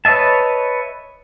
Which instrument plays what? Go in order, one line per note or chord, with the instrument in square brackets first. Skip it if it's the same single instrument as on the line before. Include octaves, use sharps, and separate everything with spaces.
[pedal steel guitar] B4 C#5 D#5 E5 A5